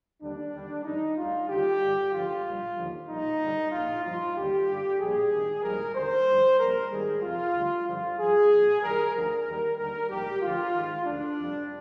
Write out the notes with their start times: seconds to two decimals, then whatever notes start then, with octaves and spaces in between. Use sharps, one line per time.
0.21 D#2 D3 G3 D4
0.53 D#2 D3 G3
0.84 F2 D#3 G3 D#4
1.16 D2 D3 G3 F4
1.48 D#2 D3 G3 G4
1.80 G2 D3 G3
2.12 G#1 G2 D3 F3 F4
2.44 A#1 A#2 G3
2.76 D#2 D3 F3
3.07 A#1 A#2 G3 D#4
3.39 G2 D3 G3
3.71 A#1 A#2 F3 F4
4.03 G2 F3 F4
4.35 D#2 D3 G3 G4
4.67 G2 D3 G3
4.99 A#1 A#2 G3 G#4
5.31 G#1 G2 D#3
5.63 A#1 G#2 D#3 G3 A#4
5.95 D#2 D3 G3 C5
6.26 G2 D3 F3
6.59 A#1 A#2 G3 A#4
6.90 G#1 G#2 D#3 G3 G#4
7.22 F2 C3 F3 F4
7.55 D2 D3 G3
7.86 G2 D3 F3 F4
8.18 G2 F3 G#4
8.51 C2 A#2 F3
8.82 G2 D#3 G3 A#4
9.14 D2 D3 F3 A#4
9.45 D#2 D#3 G3
9.78 D#2 D3 G3 A#4
10.09 A#1 G#2 G3 G4
10.41 D2 D3 F3 F4
10.73 G#1 G#2 D#3
11.05 D2 D3 F3 D4
11.37 F2 C3 G3